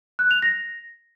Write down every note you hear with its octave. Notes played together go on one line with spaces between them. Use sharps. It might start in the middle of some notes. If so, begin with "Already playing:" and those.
F#6
F7
A#6